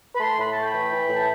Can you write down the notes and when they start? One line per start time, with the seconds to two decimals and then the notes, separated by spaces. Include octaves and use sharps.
0.15 B5
0.20 A3 A5 C6
0.38 A2 B5
0.51 A5
0.56 A3
0.62 G5 B5
0.74 E3
0.91 E3
1.09 A2
1.16 A5